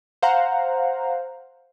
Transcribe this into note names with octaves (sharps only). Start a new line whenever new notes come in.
C5 F5 F#5 A#5